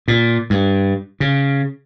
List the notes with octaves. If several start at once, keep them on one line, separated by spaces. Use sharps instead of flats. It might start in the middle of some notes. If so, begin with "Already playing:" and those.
A#2
G2
C#3